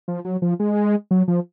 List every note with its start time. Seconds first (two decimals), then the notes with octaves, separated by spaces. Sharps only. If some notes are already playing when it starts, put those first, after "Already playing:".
0.08 F3
0.25 F#3
0.42 F3
0.60 G#3
1.11 F#3
1.28 F3